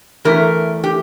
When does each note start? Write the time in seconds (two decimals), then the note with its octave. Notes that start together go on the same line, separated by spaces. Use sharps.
0.25 E2 E3 A3 A#4
0.84 G4